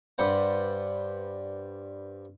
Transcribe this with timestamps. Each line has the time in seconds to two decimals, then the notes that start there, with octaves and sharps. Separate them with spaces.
0.18 G2 D4 B4 C5 F#5